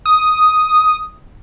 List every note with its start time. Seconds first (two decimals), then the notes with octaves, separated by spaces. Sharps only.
0.06 D#6